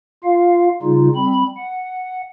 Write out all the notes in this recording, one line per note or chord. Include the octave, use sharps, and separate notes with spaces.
F4 F5
C#3 G3 D#4 F4
G3 C4 B5
F#5